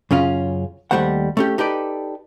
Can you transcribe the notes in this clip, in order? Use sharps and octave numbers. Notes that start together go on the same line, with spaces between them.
F#2 C#3 C#4 F4
D#2 F#3 G3 A3 C5 F#5
A3 C#4 G4
D#4 G4 A4 B4 D5